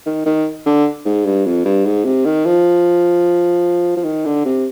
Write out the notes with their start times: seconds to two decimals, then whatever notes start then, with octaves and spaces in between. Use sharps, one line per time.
0.06 D#3
0.26 D#3
0.66 D3
1.05 G#2
1.25 G2
1.45 F2
1.65 G2
1.86 G#2
2.05 C3
2.25 D#3
2.45 F3
3.97 F3
4.04 D#3
4.25 D3
4.45 C3